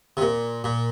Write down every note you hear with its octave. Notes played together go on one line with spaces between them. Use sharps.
C3
A#2
A#2